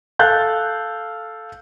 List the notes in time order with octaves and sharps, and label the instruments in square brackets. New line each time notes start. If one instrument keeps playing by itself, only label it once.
[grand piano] A4 F5 F#6 G6 A6